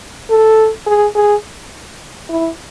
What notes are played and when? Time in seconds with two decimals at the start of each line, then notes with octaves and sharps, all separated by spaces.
0.30 A4
0.87 G#4
1.15 G#4
2.29 E4